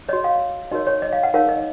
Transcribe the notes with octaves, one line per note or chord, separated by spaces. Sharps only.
F#4 C#5 D#5
F5
D#4 F#4 A#4 C#5 D#5
C#5
D#5
F5
F#5
D#4 A#4 C#5 F5
D#5